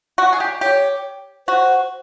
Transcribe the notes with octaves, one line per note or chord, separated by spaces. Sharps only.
F#4
G#4
G4
G4 C#5
F#4 C5